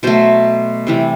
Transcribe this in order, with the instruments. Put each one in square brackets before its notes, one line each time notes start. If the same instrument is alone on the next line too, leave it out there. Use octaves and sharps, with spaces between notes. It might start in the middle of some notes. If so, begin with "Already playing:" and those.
[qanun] B2 F#3 A3 C5
C3 E3 G3